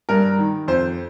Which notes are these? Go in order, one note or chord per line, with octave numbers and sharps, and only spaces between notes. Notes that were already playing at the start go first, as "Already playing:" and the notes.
G2 A#4
D#3
F2 C5